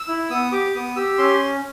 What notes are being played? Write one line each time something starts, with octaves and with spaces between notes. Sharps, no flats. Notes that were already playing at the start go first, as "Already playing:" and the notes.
Already playing: E6
E4
B3 D#6
G4 D6
B3 D#6
G4 E6
C#4 C6